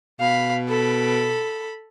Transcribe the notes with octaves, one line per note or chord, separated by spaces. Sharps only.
B2 F5 B5
A4 B5